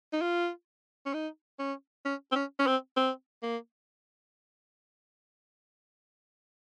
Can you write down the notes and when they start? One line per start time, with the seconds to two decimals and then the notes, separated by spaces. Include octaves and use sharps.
0.13 D#4
0.21 F4
1.06 C#4
1.14 D#4
1.59 C#4
2.05 C#4
2.32 C4
2.35 C#4
2.59 C#4
2.67 C4
2.97 C4
3.43 A#3